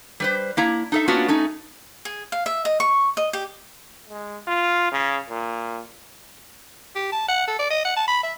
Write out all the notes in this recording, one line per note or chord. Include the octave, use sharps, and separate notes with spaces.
G3 B4 C5
A#3 E4 A#5
D#4 A4 E5
A#3 B3 C#4 D4 F4 F#4
A3 C#4 D#4
G#4
F5
E5
D#5
C#6
D#5
G4
G#3
F4
C#3
A#2
G4
A5
F#5
A4
D5
D#5
F#5
A5
B5
E5